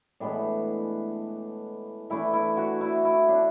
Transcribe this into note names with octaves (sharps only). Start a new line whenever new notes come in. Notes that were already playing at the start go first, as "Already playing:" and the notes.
A2 E3 G#3 B3 D4
E3 A3 D4 E4
E4
F#4
E4
E4
D4